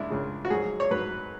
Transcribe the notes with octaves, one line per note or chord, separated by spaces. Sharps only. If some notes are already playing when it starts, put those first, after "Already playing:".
Already playing: C#2 C#3 G#3 D4 E4
C#2 C#3 G#3
F#4
G#2 F#3 G#4
C#5
G#2 F#3 B4